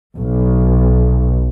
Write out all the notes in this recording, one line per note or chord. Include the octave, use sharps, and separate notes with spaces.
B1